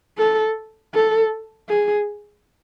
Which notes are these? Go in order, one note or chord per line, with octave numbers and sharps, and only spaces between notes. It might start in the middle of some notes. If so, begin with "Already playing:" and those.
A4
A4
G#4